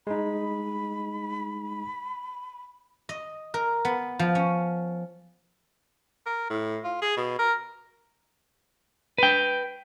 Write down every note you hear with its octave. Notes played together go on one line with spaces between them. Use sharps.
G#3 D#4 B5
D#5
A#4
B3
F3
C#4
A#4
A2
F4
G#4
B2
A#4
B4 G5